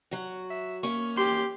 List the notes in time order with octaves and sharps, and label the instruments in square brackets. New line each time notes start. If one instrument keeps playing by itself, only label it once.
[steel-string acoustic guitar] F#3 F#4
[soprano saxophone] E5
[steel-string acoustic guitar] A#3 C#4 [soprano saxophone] C#6
[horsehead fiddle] G4 [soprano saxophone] C6